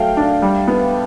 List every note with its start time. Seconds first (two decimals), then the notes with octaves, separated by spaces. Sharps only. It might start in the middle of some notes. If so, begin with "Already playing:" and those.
Already playing: F#3 A3 F5 G5
0.17 D4
0.42 G3
0.68 B3